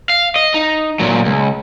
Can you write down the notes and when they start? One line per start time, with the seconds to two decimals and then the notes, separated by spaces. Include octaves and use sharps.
0.09 F5
0.36 D#5
0.54 D#4
1.00 A#2 F#3
1.25 C#2